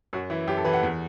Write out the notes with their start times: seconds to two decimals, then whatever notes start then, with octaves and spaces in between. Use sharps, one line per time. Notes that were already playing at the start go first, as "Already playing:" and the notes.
0.13 F#2 F#4
0.30 E3 E4
0.47 F#2 G4
0.57 A4
0.65 E3 B4
0.73 F#5
0.83 E2